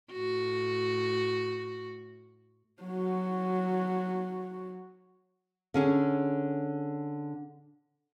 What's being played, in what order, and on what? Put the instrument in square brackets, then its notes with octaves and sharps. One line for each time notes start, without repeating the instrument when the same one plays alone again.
[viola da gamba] A2 F#4
[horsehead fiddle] F#3 F#4
[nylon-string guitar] D3 C#4 G#4